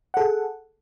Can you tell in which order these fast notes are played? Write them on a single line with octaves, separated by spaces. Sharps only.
F#5 A4 G#4